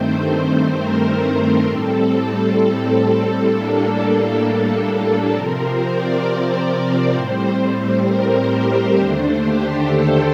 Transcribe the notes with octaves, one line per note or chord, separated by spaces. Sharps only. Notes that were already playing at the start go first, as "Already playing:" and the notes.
Already playing: G2 D#3 A3 C4 C5
A#4
A2 G3 C4 A4
A4
A2 G3 A#3 D4
A4
C3 F3 C4 A#4
C5
D5
C5
A2 G3 C4
A#4
G4
D#2 D3 A3 D4 C5
G4
A4